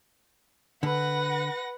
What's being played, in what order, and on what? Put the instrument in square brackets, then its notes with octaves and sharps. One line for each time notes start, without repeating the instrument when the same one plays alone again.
[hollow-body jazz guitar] D3 [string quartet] B4 F#5 A#6